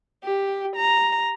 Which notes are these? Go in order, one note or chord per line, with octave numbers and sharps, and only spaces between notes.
G4
A#5